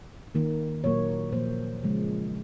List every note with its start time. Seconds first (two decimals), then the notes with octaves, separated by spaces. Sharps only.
0.35 D#3 A#3
0.84 A#2 F#3 A#3 C#5
1.33 A#2 F3 A#3 C5
1.83 C#3 F3 G#3